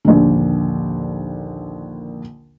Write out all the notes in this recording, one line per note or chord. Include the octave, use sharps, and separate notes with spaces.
A#1 D#2 D3